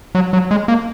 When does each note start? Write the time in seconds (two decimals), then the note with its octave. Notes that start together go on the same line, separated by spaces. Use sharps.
0.15 F#3
0.33 F#3
0.51 G#3
0.68 A#3